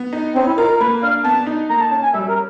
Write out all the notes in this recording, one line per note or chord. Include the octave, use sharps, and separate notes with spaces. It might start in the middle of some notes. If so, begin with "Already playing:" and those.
Already playing: B3
D#4
C4 C#4
E4
F4 A#4
A#4
A#3 B4
D4 F5
B3 A5
D#4
A#3 A#5
A5
C#4 A5
G#5
G3 E5
A#4